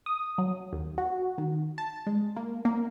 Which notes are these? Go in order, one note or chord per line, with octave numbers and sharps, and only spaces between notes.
D#6
F#3
D#2
F#4
D#3
A5
G#3
A#3
A#3